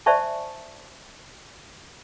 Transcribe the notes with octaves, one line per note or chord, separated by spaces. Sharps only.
C5 D5 E5 G#5 A5 C#6